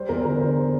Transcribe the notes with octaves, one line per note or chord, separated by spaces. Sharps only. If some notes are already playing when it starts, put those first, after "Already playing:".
Already playing: G3 C5
E2 A#4
D3 A#4
D3 C5